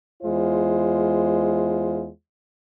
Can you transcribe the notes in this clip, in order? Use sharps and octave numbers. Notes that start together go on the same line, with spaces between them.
E2 G#3 F4 C5